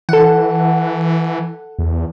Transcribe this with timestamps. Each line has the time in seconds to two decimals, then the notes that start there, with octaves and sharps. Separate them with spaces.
0.09 E3 A4 F#5
1.79 E2